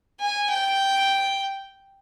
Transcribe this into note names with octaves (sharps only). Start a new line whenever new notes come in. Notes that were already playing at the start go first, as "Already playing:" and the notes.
G#5
G5